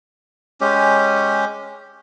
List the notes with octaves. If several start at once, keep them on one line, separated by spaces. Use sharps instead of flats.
G#3 C#4 G4